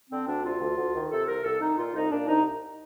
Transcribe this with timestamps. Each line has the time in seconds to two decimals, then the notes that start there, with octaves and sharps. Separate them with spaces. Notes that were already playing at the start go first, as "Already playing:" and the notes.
0.10 D3 C4
0.26 D2 D4
0.43 C3 F4
0.60 D2
0.77 D2
0.94 D#3
1.10 C3 A4
1.27 C2 A#4
1.43 C2 A4
1.60 D#3 D#4
1.76 A#2 F4
1.93 C2 D#4
2.11 A#2 D4
2.27 C2 D#4